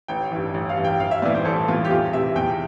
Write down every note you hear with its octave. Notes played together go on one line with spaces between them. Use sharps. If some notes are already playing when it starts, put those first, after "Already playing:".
A1 G5
G2 E3
A1
F5
G2 E3
G5
A1 F5
E5
A2 E3 D5
C5
A1 A4
A2 E3 F4
G4
E2 F4
C3 E3 E5
E2 G5